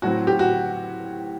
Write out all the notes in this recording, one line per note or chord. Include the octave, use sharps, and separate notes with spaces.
A2 F#3 C4 F#4
G4
F#4